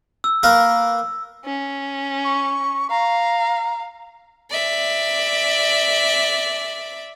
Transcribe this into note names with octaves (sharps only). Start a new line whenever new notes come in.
E6
A#3 A#4 B4
C#4
C#6
F5 A#5
D5 E5